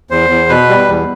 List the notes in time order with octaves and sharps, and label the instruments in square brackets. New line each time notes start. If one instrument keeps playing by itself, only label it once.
[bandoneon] E2 C5
E2
B2 B4
G3
E2